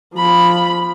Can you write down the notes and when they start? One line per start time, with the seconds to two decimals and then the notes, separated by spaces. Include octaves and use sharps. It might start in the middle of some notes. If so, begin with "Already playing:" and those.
0.15 F3 B5